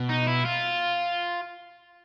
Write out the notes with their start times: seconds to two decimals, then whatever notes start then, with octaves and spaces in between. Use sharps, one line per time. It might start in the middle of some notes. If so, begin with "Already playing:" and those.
Already playing: B2
0.10 D#4
0.27 E4
0.45 F4